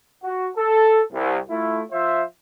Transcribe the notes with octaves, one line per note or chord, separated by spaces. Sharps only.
F#4
A4
C2
A3 E4 F4
F3 F4 C5 E5